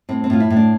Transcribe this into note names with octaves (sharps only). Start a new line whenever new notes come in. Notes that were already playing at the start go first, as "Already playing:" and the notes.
A2 C4
C4
A2 F4
E4
A2
D4